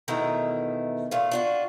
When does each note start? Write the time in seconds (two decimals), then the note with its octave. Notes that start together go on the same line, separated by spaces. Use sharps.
0.08 E2 B2 D#3 A3 E4 A#5
1.11 A#2 A3 F4
1.31 D4 F4 F#4